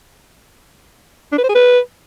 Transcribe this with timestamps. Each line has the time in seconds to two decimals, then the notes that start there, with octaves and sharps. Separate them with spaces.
1.32 D4
1.38 B4
1.44 C5
1.49 G#4
1.55 B4